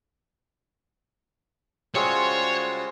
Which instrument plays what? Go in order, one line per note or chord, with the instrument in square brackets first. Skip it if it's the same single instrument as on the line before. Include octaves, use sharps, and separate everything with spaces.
[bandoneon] C#3 F4 F#4 [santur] G3 G#3 E6 [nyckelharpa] C5 [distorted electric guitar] C#5